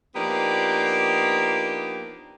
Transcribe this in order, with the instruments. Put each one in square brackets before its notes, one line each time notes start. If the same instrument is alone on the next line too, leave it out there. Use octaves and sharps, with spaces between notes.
[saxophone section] F3 A#3 B3 D4 D#4 G4